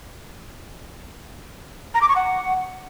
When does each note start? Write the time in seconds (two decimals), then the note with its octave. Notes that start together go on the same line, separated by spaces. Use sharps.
1.94 A#5
2.02 D6
2.09 C#6
2.16 F#5